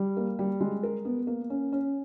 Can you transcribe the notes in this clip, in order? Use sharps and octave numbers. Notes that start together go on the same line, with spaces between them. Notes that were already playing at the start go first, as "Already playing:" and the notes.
Already playing: G3
A#3
G3
G#3
A#4
B3
A#3
C#4
C#4